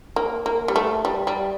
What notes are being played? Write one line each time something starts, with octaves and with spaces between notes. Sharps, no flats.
A#3
A#3
G3
A3
G3
G3